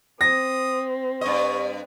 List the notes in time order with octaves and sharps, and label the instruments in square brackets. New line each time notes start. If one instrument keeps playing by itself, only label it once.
[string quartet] C4 [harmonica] D#6 [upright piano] A#6
[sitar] G2 D#5 [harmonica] C#5